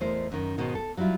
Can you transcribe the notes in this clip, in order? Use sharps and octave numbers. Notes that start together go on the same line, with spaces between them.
E2 G#3 A3 E4 A#4 C5
F#2 D#3
G#2 B2 D#3
A4
F#3 G3 C#4 E4 F4